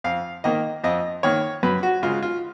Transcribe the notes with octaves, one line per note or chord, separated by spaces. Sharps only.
F2 F5
D#3 A#3 D#5
F2 D#5
D#3 A#3 C#5
F#2 B4
F#4
C#3 G#3 F4
F4